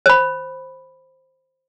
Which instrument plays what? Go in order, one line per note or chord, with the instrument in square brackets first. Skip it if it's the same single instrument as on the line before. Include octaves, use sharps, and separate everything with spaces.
[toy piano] C5 B5